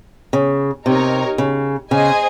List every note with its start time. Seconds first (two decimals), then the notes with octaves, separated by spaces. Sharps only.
0.33 C#3
0.86 C3 D#4 A#4 C#5
1.38 C#3
1.91 C#3 G#4 C5 D#5 G#5